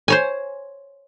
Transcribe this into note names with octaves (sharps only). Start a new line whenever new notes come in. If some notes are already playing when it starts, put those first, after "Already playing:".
C5 C#5 G#5